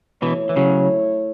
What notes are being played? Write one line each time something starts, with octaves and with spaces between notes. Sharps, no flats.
B2 E3 A3 E4 C#5
E3
C#3 F#3